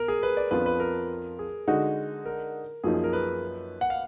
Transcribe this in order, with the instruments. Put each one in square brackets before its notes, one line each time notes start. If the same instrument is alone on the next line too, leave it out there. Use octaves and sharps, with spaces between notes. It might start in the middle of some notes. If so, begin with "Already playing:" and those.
Already playing: [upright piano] B2 [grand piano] A#4
[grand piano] G#4
B4
D5
[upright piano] F2 F3 B3 D4 F4 [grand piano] B4
[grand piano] B4
A#4
G#4
[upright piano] D3 G#3 D#4 F#4
[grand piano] A#4
[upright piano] F#2 F3 A#3 D#4 [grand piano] G#4
[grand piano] G#4
A#4
B4
F#5
F5